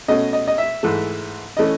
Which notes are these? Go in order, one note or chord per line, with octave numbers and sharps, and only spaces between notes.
B2 A3 C#4 D#5
D#5
D#5
E5
G#2 E3 A3
E3 A3 C#4 D#5